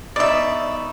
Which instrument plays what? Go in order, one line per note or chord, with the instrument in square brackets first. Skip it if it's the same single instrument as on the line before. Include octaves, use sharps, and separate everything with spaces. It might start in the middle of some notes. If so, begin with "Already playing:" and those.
[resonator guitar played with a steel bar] B2 D#4 [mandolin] D5 E5